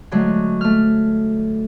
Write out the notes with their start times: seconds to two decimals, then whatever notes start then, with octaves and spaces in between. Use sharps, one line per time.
0.11 D3 F#3 G#3 A3
0.61 A3 F6